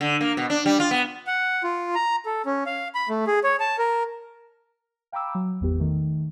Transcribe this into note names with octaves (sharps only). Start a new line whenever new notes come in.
D3
A#3
B2
D4
G3
F4
B3
F#5
F4
A#5
A4
C#4
F5
B5
A3
G#4
C#5
A5
A#4
F5 G5 A#5 B5 D6 E6
F#3
G#1 E2 B3 G4
D#3 A3